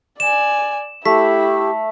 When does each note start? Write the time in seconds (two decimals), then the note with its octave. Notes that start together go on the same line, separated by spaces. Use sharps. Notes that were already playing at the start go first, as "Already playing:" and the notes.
0.20 D5 G#5 E7
1.05 A3 E4 G4 B6